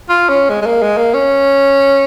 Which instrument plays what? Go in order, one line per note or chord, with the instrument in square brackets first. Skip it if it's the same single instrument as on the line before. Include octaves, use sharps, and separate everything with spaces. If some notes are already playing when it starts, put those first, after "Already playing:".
[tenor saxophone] F4
C#4
G#3
G#3
A#3
G#3
A#3
C#4